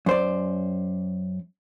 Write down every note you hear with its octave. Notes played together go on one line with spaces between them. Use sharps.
F#2 C5 D5